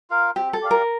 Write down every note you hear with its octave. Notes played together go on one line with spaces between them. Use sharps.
F4 A#4 F5
C4 G4
A4
G4 D5 F5
A#4